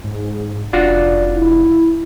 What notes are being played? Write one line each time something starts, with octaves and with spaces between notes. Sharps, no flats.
G#2
F1 D4 F4 F#4 D5
E4